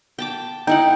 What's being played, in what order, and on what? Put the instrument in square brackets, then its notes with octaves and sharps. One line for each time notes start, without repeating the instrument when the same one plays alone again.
[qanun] G5 A5 D6
[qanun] D#4 E4 F#5 [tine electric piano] G5